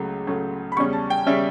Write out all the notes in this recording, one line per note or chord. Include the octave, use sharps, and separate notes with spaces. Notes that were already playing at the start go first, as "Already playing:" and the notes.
Already playing: C#2 C#3 F#3 A3
C#2 C#3 F#3 A3
B5
E2 C#3 G3 C#4 C#6
A5
G5
C#3 G3 C#4 E5